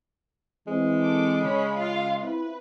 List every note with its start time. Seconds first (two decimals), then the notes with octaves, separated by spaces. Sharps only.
0.67 E3 G#3 C4
0.99 A4 D6
1.43 C#3 C#4 C#5 B5
1.75 F4 F5
2.22 C4 E4 B4